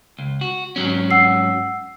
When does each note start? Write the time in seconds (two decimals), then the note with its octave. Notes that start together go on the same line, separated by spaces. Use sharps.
0.19 C#2
0.41 F#4
0.76 G#2 F#3 C#4
1.11 F#5 E6 C7